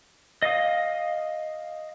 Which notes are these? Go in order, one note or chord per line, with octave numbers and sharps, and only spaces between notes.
D#5 F5 D#6